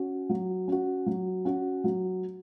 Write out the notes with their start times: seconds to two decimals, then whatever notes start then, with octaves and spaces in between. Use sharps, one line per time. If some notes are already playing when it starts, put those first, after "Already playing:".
Already playing: C#4 F#4
0.29 F#3
0.68 C#4 F#4
1.06 F#3
1.45 C#4 F#4
1.84 F#3